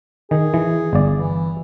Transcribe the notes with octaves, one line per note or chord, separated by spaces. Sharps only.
D#3 G#4
E3
G1 D5
E3